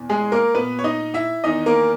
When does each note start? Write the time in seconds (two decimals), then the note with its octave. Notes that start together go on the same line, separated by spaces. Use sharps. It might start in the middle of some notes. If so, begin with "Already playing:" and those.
Already playing: E2 B2
0.10 G#3 G#4
0.32 A#3 A#4
0.55 A#2 B3 B4
0.79 C#5
0.84 D#4 D#5
1.14 E4 E5
1.44 E2 D#3 D#4 D#5
1.66 A#3 A#4